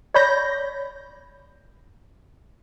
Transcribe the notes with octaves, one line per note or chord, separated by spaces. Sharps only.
C#5 D5 B5 G6 A#6